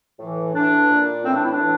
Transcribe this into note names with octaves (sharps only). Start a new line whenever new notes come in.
A2 E3
A2 E3 D4
A#2
A2 E3 C4
D4
E4
D4
A2 E3